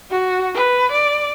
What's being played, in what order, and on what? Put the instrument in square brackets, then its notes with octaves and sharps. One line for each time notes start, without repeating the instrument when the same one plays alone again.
[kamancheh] F#4
B4
D5